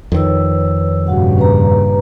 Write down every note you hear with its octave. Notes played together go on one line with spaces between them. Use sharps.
F2 D#3 B4 C#5 E6
G2 A#2 C#3 F#4 F5 F#5
C#4 B4 A#5